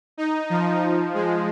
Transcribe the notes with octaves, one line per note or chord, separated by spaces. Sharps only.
D#4
F3
G#3